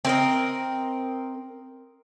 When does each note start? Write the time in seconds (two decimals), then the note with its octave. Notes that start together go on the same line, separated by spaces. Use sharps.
0.05 C4 A#4 D#5